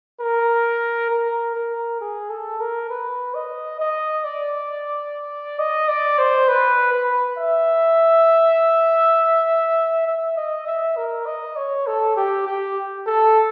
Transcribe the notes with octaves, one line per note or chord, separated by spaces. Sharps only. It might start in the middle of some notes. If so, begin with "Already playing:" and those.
A#4
A#4
A#4
G#4
A4
A#4
B4
D#5
D#5
D5
D#5
D5
C5
B4
B4
E5
E5
D#5
E5
A#4
D#5
C#5
A4
G4
G4
A4